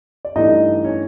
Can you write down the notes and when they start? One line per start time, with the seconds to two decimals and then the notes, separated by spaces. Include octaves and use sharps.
0.25 D5
0.36 G2 E3 A3 D#4 D#5
0.84 C#4 C#5